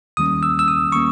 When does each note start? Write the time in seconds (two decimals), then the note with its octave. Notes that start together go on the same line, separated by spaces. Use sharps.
0.17 D#2 D#3 G3 A#3 C#4 D#6
0.43 E6
0.59 E6
0.68 D#6
0.92 D#3 G3 A#3 C#4 C#6